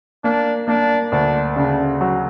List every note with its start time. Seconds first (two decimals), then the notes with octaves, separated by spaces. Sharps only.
0.24 A#3 D4
0.68 A#3 D4
1.12 D2 D4
1.56 C#3 D4
2.01 F#3